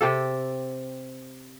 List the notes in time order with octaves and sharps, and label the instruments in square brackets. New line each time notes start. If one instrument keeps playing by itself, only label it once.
[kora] C3 G4 A4